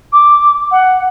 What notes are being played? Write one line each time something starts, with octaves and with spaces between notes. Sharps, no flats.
D6
F#5